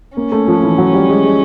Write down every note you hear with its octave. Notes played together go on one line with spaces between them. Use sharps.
A#3 C#4
A3
F3
E3
F#3
G3
G#3
G#3